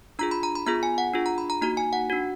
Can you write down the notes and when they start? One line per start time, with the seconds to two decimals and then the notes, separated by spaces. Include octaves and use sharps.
0.19 D4 F4 G#4 A#5
0.31 B5
0.43 A#5
0.55 B5
0.67 B3 F4 G#4 A#5
0.83 G#5
0.98 F#5
1.14 D4 F4 G#4
1.26 A#5
1.38 B5
1.50 A#5
1.62 A#3 D#4 F#4 A#5
1.77 G#5
1.93 F#5
2.10 D4 F#4